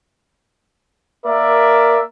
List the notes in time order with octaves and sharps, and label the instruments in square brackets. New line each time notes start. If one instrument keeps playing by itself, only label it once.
[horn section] A#3 A#4 D5 E5